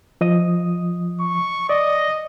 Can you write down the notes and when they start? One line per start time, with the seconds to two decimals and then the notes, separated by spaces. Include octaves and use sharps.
0.21 F3 D#5 D#6
1.21 C#6
1.69 D5 D#5